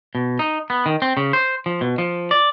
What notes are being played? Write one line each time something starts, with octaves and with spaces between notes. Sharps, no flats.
B2
D#4
B3
D#3
C4
C#3
C5
F3
B2
F3
D5